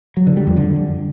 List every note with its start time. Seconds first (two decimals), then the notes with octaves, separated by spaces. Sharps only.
0.17 F#3
0.27 D3
0.37 G3
0.47 F2
0.57 D3